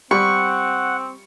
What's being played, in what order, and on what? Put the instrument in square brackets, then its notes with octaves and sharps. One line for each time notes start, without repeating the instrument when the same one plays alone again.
[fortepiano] G3 [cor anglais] C4 [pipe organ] F#5 [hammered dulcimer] C#6